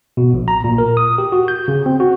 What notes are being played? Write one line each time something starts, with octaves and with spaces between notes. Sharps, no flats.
B2
A#1
A#5
A#2
A#4
D#6
G4
F#4
G6
C#3
C4
F#4